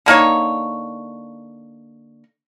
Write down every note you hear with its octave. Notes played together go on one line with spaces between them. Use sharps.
D3 A#3 D#4 C#5